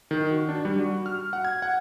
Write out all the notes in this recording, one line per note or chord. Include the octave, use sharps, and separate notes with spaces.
D#3
F#4
D4
G3
F#4
F6
F#5
G#6
F#5